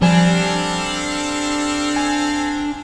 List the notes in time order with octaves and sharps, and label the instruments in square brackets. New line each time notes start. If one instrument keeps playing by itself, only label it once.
[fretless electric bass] F3 [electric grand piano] G3 G#5 [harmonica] C4 A4 F5 [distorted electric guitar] D4
[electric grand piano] G#5